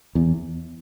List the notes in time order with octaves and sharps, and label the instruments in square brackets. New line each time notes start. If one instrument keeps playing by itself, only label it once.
[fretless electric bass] E2